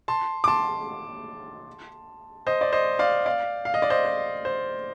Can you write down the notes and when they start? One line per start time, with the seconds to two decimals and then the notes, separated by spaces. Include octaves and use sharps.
0.08 A5 C6
0.44 D6
0.48 A5 C6
2.47 C5 D#5
2.61 D5
2.73 C5 D#5
2.99 D5 F5
3.26 D5 F5
3.65 F5
3.74 D#5
3.82 D5
3.90 C5 D#5
4.05 C5
4.45 C5